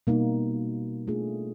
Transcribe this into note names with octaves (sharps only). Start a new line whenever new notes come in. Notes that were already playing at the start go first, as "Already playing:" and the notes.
B2 G3 A#3 D#4
A3 D4 F4 G#4